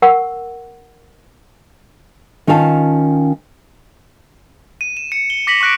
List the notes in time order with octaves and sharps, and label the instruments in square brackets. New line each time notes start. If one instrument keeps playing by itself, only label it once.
[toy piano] A#4 F#5 C#6 E6
[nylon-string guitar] D#3 C#4 F4 F5 G5 A5
[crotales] D#7
E7
C#7
G7
D6 A#6 B6 C#7 F#7
C#6 D6 F#6 A#6 D7